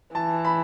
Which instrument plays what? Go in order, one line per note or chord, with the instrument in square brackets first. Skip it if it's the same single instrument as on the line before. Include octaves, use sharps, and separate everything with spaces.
[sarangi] E3 [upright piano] A5
[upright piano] B5